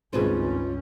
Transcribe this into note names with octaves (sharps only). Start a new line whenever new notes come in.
G#1 C#2 G2 C#4 F4 G#4 B4 C5